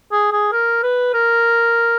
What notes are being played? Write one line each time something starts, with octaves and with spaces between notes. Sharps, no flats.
G#4
G#4
A#4
B4
A#4